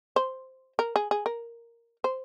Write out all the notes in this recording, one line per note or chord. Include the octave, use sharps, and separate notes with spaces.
C5
A#4
G#4
G#4
A#4
C5